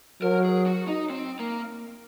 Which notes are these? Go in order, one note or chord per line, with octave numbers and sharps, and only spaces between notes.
F#3 A#4
G#4
F#4
D#4
C4
A#3